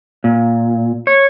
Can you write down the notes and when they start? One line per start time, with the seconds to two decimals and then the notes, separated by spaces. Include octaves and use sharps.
0.24 A#2
1.07 C#5